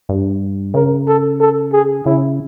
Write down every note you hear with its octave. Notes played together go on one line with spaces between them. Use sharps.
G2
C#3 A#4
A4
A4
G#4
C#3 E4